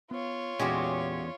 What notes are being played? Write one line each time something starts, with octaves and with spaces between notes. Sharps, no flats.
B3 F4 C#5
E2 A#2 G#3 C#4 F#4 G4